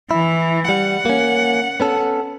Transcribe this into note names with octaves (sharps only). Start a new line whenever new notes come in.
E3 E4
G3 F#5
A#3 C#4
B3 C#4 A4